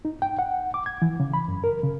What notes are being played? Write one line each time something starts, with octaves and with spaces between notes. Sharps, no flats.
D#4
G5
F#5
D6
G#6
E3
C#3
B5
F#2
A#4
C#3